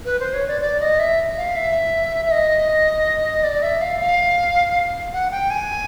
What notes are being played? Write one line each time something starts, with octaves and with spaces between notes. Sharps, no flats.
B4
C5
C#5
D5
D5
D#5
E5
F5
E5
E5
D#5
D5
E5
F5
F5
F#5
G5
G#5